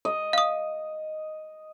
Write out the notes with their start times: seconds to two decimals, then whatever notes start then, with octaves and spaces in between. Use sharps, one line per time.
0.05 D#5
0.33 F5 D#6